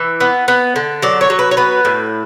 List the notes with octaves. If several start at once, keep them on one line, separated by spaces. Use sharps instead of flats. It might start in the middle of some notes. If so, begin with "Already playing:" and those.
Already playing: E3 E5
B3
B3
D3
F#3 D5
C#5
F#3
B4
C#5
B3 B4
A2